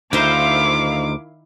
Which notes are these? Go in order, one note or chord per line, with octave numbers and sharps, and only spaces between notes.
D2 D#3 D#4 E4 C5 F5 D6